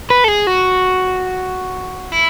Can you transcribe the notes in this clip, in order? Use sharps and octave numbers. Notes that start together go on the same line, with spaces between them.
B4
A4
G#4
F#4
E4